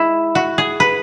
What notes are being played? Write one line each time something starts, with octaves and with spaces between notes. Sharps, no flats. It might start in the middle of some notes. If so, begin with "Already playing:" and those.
Already playing: G#3 E4
F#4
G#4
B4